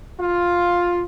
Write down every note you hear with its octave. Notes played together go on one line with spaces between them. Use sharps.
F4